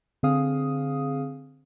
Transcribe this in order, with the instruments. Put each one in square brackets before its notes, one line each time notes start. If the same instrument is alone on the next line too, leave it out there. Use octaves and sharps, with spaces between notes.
[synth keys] D3 C4 G#4 F5 D#6